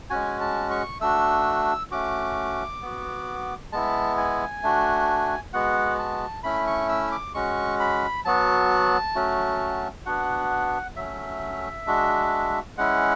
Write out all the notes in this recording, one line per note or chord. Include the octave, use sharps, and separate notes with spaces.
G#3 C#4 F#4 G#5
A5
C#6
A3 D4 F#4 E6
A3 C#4 F#4 D6
B3 F#4
G#3 B3 E4 A5
G#5
A3 D4 F#4
G#3 B3 F#4 F#5
A5
A3 C#4 E4 B5
C#6
E6
D6
G#3 C#4 F#4 C#6
B5
F#3 B3 F#4 A5
F#3 A3 C#4 F#4
B3 D4 F#4 F#5
F#3 A3 C#4 E5
G#3 D4 F#4
G#3 C#4 E4 F#5